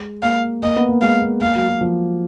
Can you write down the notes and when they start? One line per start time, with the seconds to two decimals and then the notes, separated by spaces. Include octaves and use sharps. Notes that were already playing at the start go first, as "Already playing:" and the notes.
Already playing: G#3
0.23 A#3 F5
0.62 A#3 D#5
0.76 B3
0.89 A#3
1.02 G#3 F5
1.22 A#3
1.41 A#3 F5
1.55 F#3
1.68 F#3
1.81 F3